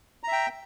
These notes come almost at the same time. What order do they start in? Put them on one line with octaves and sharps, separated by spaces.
A#5 E5 G5